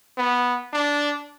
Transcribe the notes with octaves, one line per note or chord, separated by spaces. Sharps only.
B3
D4